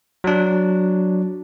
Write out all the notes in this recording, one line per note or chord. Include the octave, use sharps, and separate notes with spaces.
F#3 D4